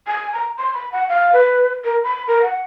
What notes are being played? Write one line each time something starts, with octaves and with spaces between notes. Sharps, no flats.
G#5
A#5
C6
B5
F#5
F5
B4
A#4
B5
A#4
F#5